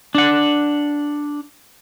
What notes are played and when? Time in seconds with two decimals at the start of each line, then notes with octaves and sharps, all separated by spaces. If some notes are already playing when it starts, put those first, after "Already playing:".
0.15 D4 F#5